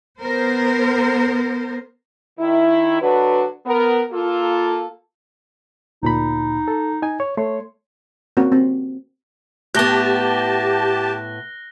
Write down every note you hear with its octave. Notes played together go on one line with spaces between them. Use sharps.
B3 A#4 C5
D#3 E4
D3 F#3 D4 F#4 B4
B3 A#4
A#3 F4 A4
D2 A#2 D#4 B5
A4
D#4 G#5
C#5
A3 C#5 C6
A#3 C4 C#4 F#4
C4
A2 B3 G4 A5 F#6 A#6 G7